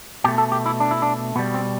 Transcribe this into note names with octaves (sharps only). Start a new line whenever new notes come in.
B2 A3 G4
A4
G4
E4
D4
E4
D4
B2 G3 B3
C4